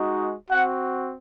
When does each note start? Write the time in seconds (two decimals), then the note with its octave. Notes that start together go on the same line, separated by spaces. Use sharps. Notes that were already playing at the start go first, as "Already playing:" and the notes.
Already playing: G#3 D#4 F#4
0.51 C4 F#4 F#5